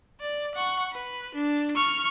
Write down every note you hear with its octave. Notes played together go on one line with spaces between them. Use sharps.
D5
F#5 C#6
B4
D4
C#6 F6